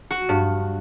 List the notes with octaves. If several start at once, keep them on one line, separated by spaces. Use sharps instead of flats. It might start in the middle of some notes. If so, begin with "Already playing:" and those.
F#4
G2